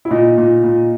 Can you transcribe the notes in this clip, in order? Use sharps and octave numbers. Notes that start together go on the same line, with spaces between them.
E4
A#2 D#4
A#2
A#2